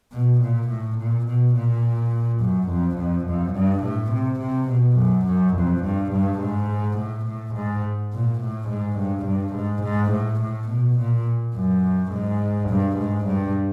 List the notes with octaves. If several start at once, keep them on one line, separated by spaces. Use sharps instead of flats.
B2
A#2
A2
A#2
B2
A#2
F#2
F2
F2
F#2
G2
A2
C3
C3
B2
F#2
F#2
F2
G2
G2
G#2
A2
A2
G#2
A#2
A2
G#2
G2
G2
G#2
G#2
A2
A2
B2
A#2
F#2
G#2
G2
G#2
G2